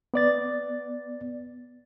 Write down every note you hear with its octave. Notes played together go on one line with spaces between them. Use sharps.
B3 D5 A6